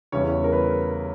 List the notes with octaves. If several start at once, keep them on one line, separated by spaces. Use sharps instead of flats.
E2 C#3 G3 C#4 E4 C#5
A#4
B4